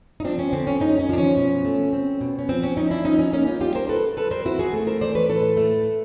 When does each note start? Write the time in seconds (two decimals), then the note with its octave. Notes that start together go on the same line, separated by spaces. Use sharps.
0.20 D#4
0.24 F3 C4 D4
0.39 C#4
0.53 D3 C4
0.67 C#4
0.80 F#2 C#4 D#4
0.99 C#4
1.09 F3 D4
1.18 C#4
1.37 B2
1.65 A3
1.93 C4
2.21 B2
2.39 C#4
2.49 F3 C4
2.63 C#4
2.77 F3 C#4 D#4
2.91 D4 E4
3.05 F3 C#4 D#4
3.19 C#4
3.33 A#3 C#4 D#4
3.47 D#4 F4
3.61 G3 F4 G4
3.75 A#4 C5
3.89 B2 A4 B4
4.17 G3 A4 B4
4.31 A#4 C5
4.45 C4 E4 F#4
4.59 F#4 G#4
4.73 A3
4.87 A#4 C5
5.01 E3 C5 D5
5.15 B4 C#5
5.29 A2 A4 B4
5.57 A3